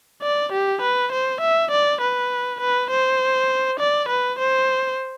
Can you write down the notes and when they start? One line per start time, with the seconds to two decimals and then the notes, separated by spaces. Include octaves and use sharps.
0.23 D5
0.52 G4
0.82 B4
1.12 C5
1.41 E5
1.71 D5
2.01 B4
2.61 B4
2.90 C5
3.79 D5
4.09 B4
4.39 C5